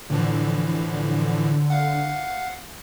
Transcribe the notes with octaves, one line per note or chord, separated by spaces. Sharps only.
A2 D3 E3 F3
F5 F#5